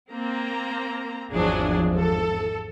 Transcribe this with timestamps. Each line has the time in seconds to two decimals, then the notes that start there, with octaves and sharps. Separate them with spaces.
0.11 A#3 C4 A#5
1.31 G#1 E2 F3 F#3 D4 G#4
1.98 A4